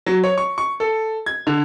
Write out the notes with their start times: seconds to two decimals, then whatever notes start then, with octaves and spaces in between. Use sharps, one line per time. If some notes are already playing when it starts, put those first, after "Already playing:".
0.06 F#3
0.24 C#5
0.38 C#6
0.58 C#6
0.80 A4
1.26 G#6
1.47 D3